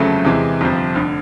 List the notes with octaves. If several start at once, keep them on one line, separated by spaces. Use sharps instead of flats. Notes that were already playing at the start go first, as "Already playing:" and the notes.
Already playing: G1 F2 C#3 F#3 A3
E2 C3 E3 G#3
G1 F2 C3 F3
F1 D3